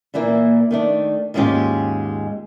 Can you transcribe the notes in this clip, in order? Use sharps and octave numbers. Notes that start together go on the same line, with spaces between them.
A#2 E3 A#3 E4
D#3 A3 D4
D#2 G#2 G#3 C#4 F4 G4